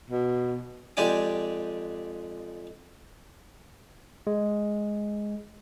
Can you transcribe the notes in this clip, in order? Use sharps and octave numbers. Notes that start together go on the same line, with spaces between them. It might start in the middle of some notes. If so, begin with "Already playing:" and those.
B2
F2 G#3 G4 D5 G#5 D6
G#3